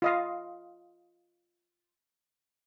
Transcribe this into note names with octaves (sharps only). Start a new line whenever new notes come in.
F4 D#5 F5